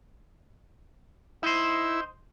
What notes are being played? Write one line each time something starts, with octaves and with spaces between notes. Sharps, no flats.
D#4 E4 C5